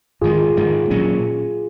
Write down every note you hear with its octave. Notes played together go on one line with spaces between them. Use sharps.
G#2 D#3 G#3 F4 G#4
G#2 D#3 G#3
A#2 F#3 C#4